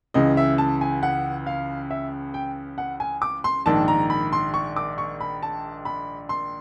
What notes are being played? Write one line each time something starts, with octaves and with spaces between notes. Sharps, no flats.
C#2 C#3 E3 D#5
E5
A5
G#5
F#5
F5
E5
G5
F#5
G#5
D6
C6
A#1 G#2 D#3 A5
A#5
B5
C6
C#6
D6
C#6
B5
A5
B5
C6